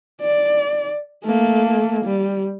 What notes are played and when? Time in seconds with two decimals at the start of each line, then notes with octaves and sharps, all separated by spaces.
0.21 D5
1.25 A3 A#3
2.05 G3